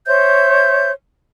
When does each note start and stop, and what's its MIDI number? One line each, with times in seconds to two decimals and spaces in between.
0.07 0.91 72
0.07 0.91 73
0.07 0.91 76
0.07 0.91 91